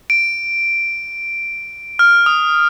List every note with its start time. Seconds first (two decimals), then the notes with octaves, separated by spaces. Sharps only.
0.10 D7
1.99 F6
2.26 D#6